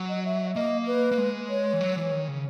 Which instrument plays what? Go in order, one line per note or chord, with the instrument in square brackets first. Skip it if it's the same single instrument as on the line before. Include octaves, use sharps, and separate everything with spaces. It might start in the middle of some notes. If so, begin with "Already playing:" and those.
Already playing: [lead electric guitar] F#3
[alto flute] D#5
E5
[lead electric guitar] A#3 [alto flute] D#5
[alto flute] B4
[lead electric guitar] A#3
G#3
[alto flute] C#5
[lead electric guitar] E3
F#3
E3
D#3
C#3